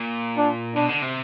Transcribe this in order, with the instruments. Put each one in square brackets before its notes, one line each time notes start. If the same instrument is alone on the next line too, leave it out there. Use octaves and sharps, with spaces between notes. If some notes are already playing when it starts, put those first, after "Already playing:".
Already playing: [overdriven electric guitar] A#2
[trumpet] D4
[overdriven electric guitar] B2 [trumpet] D4
[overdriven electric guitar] D3
C3